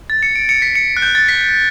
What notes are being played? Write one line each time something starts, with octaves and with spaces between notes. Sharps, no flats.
A6
C#7
D7
C#7
B6
C#7
F#6
G6
A6
B6